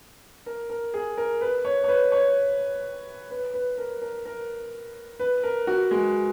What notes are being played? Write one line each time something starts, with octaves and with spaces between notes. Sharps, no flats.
A#4
A#4
G#4
A#4
B4
C#5
C#5
B4
C#5
B4
B4
A#4
A#4
A#4
B4
A#4
F#4
G#3